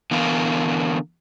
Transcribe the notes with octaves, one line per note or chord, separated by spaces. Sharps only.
D3 E3 B3 A#4 F5